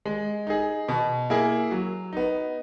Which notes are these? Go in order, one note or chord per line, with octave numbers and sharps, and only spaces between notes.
G#3
D#4 G#4
B2
A#3 E4 G#4
F#3
B3 D#4